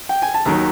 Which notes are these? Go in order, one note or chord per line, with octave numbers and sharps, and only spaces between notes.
G5
G#5
A5
D#2 D#3 F#3 A#5